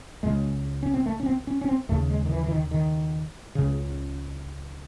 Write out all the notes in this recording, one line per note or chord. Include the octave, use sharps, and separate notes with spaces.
C#2 C#3 G#3
C#4
C4
A3
C#4
C4
C#4
C#4
C4
D#2 C#3 A3
G#3
D#3
E3
E3
D#3
D#3
C#2 C#3